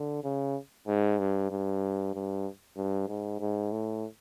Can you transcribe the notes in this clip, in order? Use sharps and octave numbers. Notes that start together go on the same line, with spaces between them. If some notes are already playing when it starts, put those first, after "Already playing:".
Already playing: D3
C#3
G#2
G2
G2
G2
G2
G#2
G#2
A2